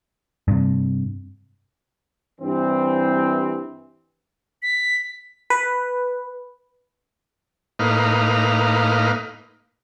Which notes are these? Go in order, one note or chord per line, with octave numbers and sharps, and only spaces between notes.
G2 C3
G2 E3 C4
B6
B4
A2 A#3 D#4 B4 F5